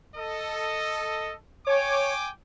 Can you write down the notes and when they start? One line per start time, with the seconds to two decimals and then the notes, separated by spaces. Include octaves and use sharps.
0.15 A4 D#5
1.67 C#5 G5 G#5 D6